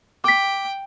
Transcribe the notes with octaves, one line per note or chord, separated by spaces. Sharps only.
G5 D6 B6